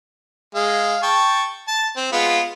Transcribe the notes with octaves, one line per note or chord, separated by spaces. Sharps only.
G#3 F5
G5 A5 C#6
A5
C4
G#3 B3 F4